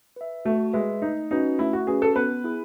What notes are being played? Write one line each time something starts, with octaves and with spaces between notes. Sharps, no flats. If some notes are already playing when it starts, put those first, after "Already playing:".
B4 E5
A3 F#4
G#3 B4 E5
A3 D#4
C#4 D#4 F#4 B4
A3 E4
F#4
C#4 F#4 G#4 B4
A4
B3 B4
E4 G#4